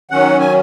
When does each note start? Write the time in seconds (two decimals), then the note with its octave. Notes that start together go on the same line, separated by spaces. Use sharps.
0.11 D#3 F#3 C#4 F#5
0.40 G#5